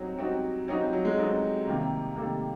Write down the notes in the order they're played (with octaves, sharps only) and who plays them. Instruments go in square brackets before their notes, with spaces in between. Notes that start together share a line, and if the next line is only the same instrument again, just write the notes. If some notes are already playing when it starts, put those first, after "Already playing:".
Already playing: [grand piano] F#3 [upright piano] G3 C4 D#4 F#4
[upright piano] G3 C4 D#4 F#4
[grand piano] F#3 [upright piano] G3 C4 D#4 F#4
[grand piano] F3
F#3
G#3
[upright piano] G3 C4 D#4 F#4 [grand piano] A3
[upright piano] C3 D#3 G3 A#3
[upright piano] C3 D#3 G3 A#3 [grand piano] A3